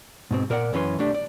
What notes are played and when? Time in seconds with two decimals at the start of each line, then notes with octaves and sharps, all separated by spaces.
0.31 G#2 B2 C4
0.50 A#2 A#4 D5 D#5 F#5
0.73 F#2 E3 C#4 B4 B5 C6
0.99 C2 A3 D4 G4
1.14 D5